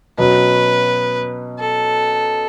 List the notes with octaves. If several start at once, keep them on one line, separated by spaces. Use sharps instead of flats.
B2 F#3 C#4 B4
A4